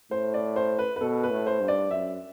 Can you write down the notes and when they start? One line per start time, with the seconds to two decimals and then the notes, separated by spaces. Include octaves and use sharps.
0.11 A2 C5
0.34 D5
0.56 C5
0.79 B4
0.96 B4
1.01 B2 A4
1.24 B4
1.31 A2
1.47 C5
1.61 G2
1.68 D5
1.90 F#2 E5